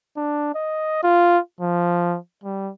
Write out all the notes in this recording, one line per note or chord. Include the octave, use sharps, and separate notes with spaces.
D4
D#5
F4
F3
G3